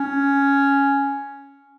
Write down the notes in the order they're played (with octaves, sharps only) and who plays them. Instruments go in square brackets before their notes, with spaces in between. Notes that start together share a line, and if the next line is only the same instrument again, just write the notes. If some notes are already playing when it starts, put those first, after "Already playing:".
Already playing: [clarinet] C#4